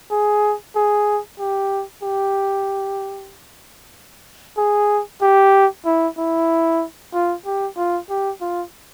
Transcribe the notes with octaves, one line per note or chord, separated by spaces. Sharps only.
G#4
G#4
G4
G4
G#4
G4
E4
E4
F4
G4
F4
G4
F4